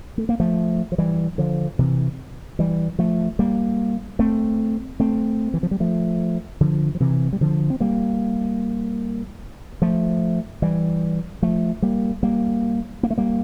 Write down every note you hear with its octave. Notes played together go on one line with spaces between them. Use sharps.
A3
A#3
F3 A3
F3
E3 G3
D3 F3
C3 E3
E3 G3
F3 A3
G3 A#3
A3 C4
A3 C4
E3
F3
G3
F3 A3
D3 F3
F3
C3 E3
G3
D3 F3
C4
G3 A#3
F3 A3
E3 G3
F3 A3
G3 A#3
G3 A#3
A#3
A3
G3 A#3